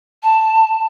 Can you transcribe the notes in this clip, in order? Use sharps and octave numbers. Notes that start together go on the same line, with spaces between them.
A5